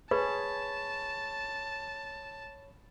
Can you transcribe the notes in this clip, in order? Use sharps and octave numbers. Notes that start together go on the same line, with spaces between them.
G#4 B4 C#5 A5 B5